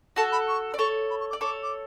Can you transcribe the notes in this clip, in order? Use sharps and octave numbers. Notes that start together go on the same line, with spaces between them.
F#4 A4 A5
B5
C#6
D5
A4 C#5 C#6
B5
C#6
D6
D5
A4 C#5 D6
D6